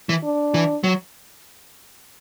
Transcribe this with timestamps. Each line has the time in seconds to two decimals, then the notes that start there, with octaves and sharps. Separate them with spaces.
0.09 E3
0.23 D4
0.54 E3
0.84 F#3